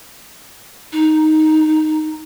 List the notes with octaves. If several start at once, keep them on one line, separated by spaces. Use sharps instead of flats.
D#4